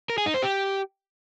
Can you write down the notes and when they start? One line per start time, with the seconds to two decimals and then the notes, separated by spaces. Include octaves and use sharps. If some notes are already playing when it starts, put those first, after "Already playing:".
0.10 A#4
0.18 G#4
0.26 D#4
0.34 C5
0.42 G4